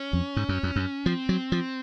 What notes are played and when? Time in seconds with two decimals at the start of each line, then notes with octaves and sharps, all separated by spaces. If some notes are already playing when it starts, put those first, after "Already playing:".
Already playing: C#4
0.13 F2
0.37 G#2
0.49 F#2
0.63 F2
0.76 F#2
1.06 F3 C4
1.29 F#3
1.52 F3